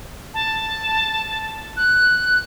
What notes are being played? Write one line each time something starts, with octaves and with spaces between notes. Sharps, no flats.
A5
F#6